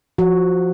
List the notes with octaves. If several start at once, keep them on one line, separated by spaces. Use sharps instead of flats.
F3 F#4